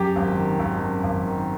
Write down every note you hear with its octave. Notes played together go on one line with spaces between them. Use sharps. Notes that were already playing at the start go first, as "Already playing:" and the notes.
Already playing: F#2 G4
G#1
D#3
G#1
F#2
G#1
D#3